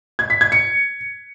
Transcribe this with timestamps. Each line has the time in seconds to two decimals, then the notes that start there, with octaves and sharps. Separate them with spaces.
0.19 G#6
0.30 B6
0.41 G#6
0.52 C#7